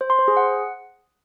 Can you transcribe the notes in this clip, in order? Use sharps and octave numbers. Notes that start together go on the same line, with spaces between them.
C5
C6
C5
G#4
F#5